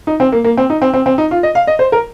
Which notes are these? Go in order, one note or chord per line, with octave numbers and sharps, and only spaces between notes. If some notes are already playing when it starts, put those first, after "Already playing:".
D#4
C4
A#3
A#3
C4
D#4
C4
C4
C4
D#4
F4
D#5
F5
D#5
C5
A#4